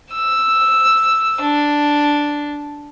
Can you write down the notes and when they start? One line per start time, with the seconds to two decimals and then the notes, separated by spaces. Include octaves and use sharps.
0.13 E6
1.41 D4